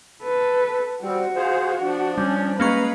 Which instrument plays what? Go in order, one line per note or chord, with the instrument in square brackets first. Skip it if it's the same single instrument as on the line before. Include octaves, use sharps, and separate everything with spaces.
[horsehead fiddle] A4 B4
[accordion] G3 C4 [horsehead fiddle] F#4
[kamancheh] F4 F5 [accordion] G#4 C5
[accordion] F3 [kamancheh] D4
[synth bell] G3 [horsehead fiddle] C#4
[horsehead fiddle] G#3 F5 [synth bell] A#3 C#4 C#6 [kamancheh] B4 A#5